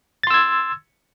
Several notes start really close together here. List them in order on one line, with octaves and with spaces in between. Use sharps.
A6 C6 E6 G#6